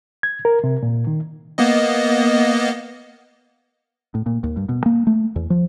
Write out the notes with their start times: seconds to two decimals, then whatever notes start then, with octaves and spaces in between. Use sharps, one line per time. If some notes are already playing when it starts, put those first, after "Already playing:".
0.23 G#6
0.45 A#4
0.64 C3
0.83 A#2
1.07 D#3
1.58 A#3 B3 D#5
4.15 A2
4.26 A#2
4.44 D#2
4.57 G2
4.69 B2
4.86 A#3
5.07 A3
5.36 E2
5.50 F3